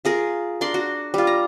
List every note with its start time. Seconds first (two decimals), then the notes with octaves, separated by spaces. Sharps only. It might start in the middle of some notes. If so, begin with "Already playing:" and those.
0.05 F4 G#4 A#4
0.61 D4 A#4 D5 C6
0.74 F#4
1.14 G3 F4
1.27 A#5